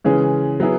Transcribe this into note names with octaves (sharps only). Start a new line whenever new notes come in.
C#3 E3 G#3 C#4 G#4
F#3 B3 E4 G#4